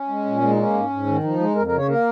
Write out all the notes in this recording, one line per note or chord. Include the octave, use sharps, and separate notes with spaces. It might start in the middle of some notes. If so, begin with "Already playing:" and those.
Already playing: C#4
G#3
A#2
G#3
D#4
A#3 C#4
G#2
G#2
D#3
F3 D#4
G#3
F2 A#4
A#4
C#3
C#5
A#3 A#4